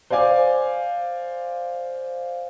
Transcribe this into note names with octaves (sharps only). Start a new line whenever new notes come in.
C5 D5 F5 G#5 D6